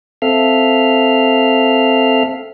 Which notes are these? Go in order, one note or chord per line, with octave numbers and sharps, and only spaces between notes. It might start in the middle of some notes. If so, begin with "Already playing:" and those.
C4 A4 E5 F5 F6